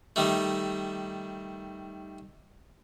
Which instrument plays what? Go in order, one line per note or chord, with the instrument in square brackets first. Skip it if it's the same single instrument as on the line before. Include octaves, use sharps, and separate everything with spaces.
[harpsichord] D#3 G3 A3